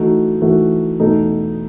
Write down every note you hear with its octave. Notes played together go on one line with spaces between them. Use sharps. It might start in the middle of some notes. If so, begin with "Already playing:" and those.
Already playing: E3 A3 D#4 F#4
E3 A3 D#4 F#4
E2 B2 A3 D#4 A4